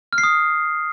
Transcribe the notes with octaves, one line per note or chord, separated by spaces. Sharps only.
F6
C7
D#6